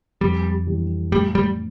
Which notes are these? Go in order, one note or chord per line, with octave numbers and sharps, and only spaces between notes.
F2 G3
E3 G3
A2 G3
G3